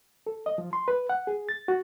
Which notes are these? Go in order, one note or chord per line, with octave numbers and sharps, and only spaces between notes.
A4
D#5
F3
C6
B4
F#5
G#4
A6
F#4